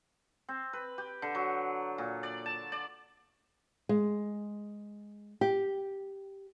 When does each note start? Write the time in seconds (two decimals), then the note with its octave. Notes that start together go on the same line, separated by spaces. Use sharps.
0.49 C4
0.73 B4
0.98 G4
1.22 D3
1.35 F#3
1.98 A#2
2.23 D5
2.46 A5
2.72 D5
3.89 G#3
5.41 G4